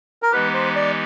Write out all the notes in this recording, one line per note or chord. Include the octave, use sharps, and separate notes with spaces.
A#4
E3 G#3 B3 D#4 G4 B4
C5
D5